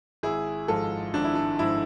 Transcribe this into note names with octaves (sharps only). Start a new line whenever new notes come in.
G#1 E4 G#4
G#2 F3 F4 A4
G#1 D4
E4
D4
G#2 F3 E4